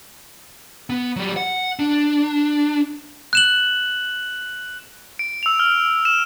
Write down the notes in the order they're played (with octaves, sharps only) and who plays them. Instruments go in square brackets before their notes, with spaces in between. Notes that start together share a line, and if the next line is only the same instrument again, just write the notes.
[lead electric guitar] B3
F#3 G3
F#5
D4
[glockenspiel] F#6 E7 F#7
[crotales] D7
E6 F7
F6
E7